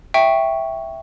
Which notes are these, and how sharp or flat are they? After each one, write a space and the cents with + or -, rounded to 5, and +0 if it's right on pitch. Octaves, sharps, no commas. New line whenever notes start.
E5 +0 G5 +0 C#6 +0